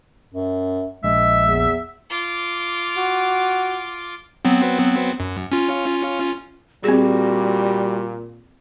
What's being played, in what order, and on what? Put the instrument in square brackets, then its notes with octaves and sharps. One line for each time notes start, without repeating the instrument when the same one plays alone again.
[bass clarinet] F#2
[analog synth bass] A#1 [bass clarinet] G#3 [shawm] E5
[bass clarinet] E2
[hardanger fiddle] F4 D6
[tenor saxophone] F#4
[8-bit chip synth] F#3 B3 C4
F#2
C#4 F4
[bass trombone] A#2 [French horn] G3 [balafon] C4 G#4 [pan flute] F#4